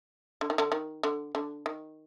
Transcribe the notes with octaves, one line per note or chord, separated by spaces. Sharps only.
D3
D#3
D3
D#3
D3
D3
D#3